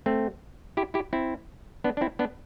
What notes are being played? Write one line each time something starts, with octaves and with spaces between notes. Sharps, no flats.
A3 C4
E4 G4
E4 G4
C4 E4
B3 D4
D4
C4 E4
B3 D4